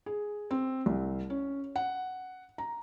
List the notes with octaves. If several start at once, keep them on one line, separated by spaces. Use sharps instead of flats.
G#4
C4
C2
C#4
F#5
A#5